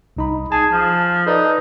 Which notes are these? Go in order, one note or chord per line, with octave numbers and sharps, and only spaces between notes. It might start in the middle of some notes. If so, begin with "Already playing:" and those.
C2 D#4 B5
G#4 A5
F3
D#4 A4 B4 D5